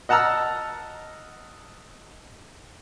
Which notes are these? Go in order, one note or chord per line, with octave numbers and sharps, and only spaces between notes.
D#5 F#5 A5 A#5 E6 F6